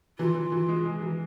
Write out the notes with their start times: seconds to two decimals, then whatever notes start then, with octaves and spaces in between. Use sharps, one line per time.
0.19 E3 F4
0.35 E3
0.52 E3
0.68 G#3
0.85 G#3
1.02 E3